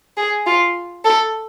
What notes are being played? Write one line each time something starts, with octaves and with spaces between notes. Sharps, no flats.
G#4
F4
A4